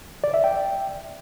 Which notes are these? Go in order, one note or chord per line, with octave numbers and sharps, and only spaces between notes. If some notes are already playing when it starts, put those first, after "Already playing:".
D5
E5
G5